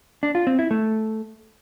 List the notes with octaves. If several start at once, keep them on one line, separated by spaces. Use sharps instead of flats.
D4
F4
C4
E4
A3